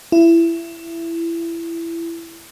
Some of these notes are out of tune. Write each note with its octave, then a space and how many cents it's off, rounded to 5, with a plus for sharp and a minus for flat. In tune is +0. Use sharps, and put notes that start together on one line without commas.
E4 +20